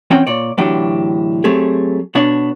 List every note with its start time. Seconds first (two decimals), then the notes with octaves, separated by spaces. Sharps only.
0.10 E3 C4 C#4 F#4 C#5 G5
0.27 A#2 C#5 D5
0.58 D2 A2 E3 F#3 D4 G4
1.44 F#3 A3 C4 G4 G#4
2.15 B2 B3 D4 C#5